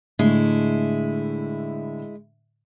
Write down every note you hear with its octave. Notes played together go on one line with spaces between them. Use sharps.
A2 D3 G#3 A3 E4